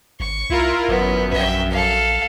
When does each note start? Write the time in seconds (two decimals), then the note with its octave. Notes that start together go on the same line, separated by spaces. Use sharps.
0.20 G#1 C#6
0.50 C2 E4 F4 A#4
0.88 G#1 F#2 B3
1.33 A#1 E5 G5
1.71 A4 F5